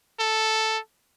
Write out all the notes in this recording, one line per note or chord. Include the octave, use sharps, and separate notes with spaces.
A4